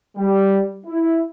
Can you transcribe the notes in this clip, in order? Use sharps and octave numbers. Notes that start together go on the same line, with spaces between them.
G3
E4